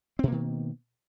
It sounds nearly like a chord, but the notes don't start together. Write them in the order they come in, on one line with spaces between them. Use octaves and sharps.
C4 B2 A#3 D#3